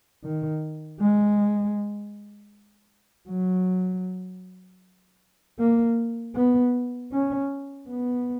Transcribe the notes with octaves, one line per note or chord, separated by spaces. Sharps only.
D#3
G#3
F#3
A#3
B3
C#4
B3